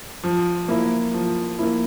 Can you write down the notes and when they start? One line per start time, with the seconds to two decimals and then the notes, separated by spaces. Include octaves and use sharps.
0.23 F3
0.68 A#3 E4
1.14 F3
1.59 A#3 E4